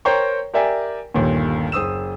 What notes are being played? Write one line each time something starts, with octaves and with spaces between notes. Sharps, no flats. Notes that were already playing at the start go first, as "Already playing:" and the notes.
A#4 C5 C#5 G5 A#5 C#6
G4 A#4 D5 E5 G5 G#5
G1 D#2 A#2
F#1 C5 D#6 E6 E7